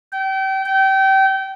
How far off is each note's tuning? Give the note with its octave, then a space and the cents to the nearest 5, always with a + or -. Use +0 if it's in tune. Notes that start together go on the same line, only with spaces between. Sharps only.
G5 -30
G5 -25